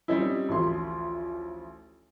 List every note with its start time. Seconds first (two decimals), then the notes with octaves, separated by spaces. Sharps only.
0.08 G3 C4 C#4 D#4 E4
0.49 A1 D2 F3 C6